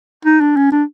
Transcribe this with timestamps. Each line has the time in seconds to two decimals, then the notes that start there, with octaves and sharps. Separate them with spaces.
0.25 D#4
0.40 D4
0.56 C#4
0.72 D4